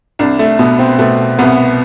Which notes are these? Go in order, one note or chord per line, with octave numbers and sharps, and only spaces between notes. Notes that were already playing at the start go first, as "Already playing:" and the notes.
C2 D4
A3
B2 B3
C4
B2 A3
C2 B3